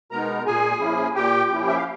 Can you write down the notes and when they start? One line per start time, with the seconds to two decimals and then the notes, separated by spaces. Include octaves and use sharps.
0.11 B2 G#3 B3 D#4 A#4 A#5
0.46 A#2 G#4 G#5
0.80 F3 A#3 C#4 E4
1.15 A#2 G4 G5
1.49 F3 A#3 C#4 E4
1.68 E5
1.76 F5